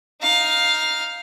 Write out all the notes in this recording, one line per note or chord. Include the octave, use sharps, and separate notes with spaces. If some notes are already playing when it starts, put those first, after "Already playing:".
D#4 F5